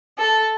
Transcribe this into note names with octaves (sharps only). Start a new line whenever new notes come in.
A4